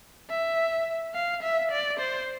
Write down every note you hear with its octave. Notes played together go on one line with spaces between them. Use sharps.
E5
F5
E5
D5
C5